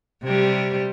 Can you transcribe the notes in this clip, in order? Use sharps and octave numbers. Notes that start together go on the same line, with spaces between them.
C3 G3